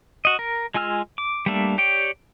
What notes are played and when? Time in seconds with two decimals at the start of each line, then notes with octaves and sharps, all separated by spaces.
0.25 F#4 D#5
0.39 A#4
0.74 G#3 F4 G#5 E6 F6
1.18 D6
1.46 G3 A3 A#3 D4 E5
1.78 G4 C#5 D5 G5